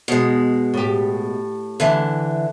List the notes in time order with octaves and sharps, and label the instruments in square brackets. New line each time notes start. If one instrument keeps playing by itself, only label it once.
[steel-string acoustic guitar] B2 G#3
[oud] A2 G4
[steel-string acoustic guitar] D3 E3